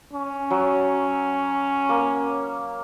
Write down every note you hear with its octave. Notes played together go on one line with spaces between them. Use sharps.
C#4
F#3
A#3